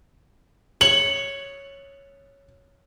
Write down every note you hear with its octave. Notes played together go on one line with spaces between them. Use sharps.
C#5 F#7